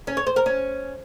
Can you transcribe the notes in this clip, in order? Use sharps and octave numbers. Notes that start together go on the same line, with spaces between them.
C#4
C#5
C5
A#4
C#4